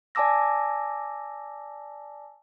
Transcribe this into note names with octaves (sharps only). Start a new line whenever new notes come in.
D5 G#5 A5 D6 E6 A#6